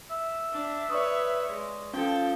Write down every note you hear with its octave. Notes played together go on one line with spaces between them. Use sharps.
E5
D4
B4 C#5 D5 C#6 D#6
G#3
F3 C#4 A4 G5